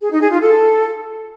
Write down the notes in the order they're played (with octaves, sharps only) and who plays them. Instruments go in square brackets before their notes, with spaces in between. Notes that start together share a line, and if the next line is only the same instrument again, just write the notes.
[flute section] G#4
D#4
G#4
F4
A4